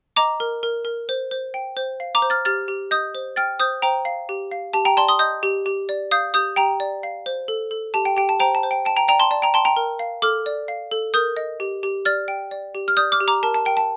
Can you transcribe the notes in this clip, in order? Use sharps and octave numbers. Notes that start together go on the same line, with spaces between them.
D#5 A#5 D6
A#4
A#4
A#4
C5
C5
G5
C5
F5
A#5 D6
C5
F6 A6
G4 F6 A6
G4
D#5 D#6 G6
C5
G5 F6 A6
C5 D#6 G6
C5 G5 A#5
F5
G4
F5
G4 A5
G5 A#5
D5 A5 C6
C6 D#6
D#5 D#6 G6
G4
G4
D5
F5 D#6 G6
G4 D#6 G6
G4 G5 A#5
D5
F5
C5
A4
A4
G4 A5
G5
G4 G5
A5
C5 G5 A#5
A5
C5
G5
G5 A5
G5 A#5
D5 G5 A#5
A5 C6
D5 A5
G5 A#5
G5 A5 C6
G5 A#5
A#4
F5
A4 D6 F6
D5
F5
A4
A#4 D#6 G6
D#5
G4
G4
D5 F6 A6
G5
D5
G4
F6
D5 D#6 G6
D6 F6
G4
A#5 D6
A#4 A5
A5
A#4 G5
A5